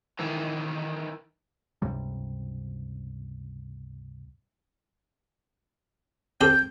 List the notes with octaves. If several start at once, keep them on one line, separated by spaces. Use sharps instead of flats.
D#3 E3
C#2 G2 C3 G3
C4 G4 A4 G6